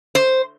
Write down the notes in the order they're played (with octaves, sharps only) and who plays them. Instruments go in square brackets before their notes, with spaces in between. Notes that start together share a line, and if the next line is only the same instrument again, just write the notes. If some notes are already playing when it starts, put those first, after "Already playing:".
[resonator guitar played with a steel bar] C5